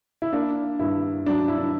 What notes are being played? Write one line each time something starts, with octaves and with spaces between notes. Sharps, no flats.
E4
A#3 D4
G2 E4
F#3 D4
E4
D4